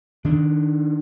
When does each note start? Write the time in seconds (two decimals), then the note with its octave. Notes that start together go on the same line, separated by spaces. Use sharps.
0.25 D#3 D4